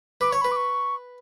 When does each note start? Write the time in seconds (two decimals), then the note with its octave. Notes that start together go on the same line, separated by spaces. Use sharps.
0.21 B4 D6
0.31 C#5 C#6
0.42 B4 B5
0.51 D6
0.56 C#6